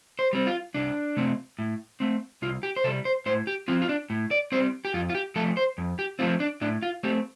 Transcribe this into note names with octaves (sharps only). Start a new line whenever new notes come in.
C5
G3 C4
F4
C2 D4
C3 A3 C4
A2
A3 C4
C2 F4
G4
C5
C3 G3 A4
C5
A2 C5
G4
F3 C4 F4
F4
D4
A2
D5
G3 C4 C5
G4
F2 F4
F4
G4
F3 A3 A4
C5
F2
G4
F3 A3 C4 F4
D4
A2 D4
F4
A3 C4 G4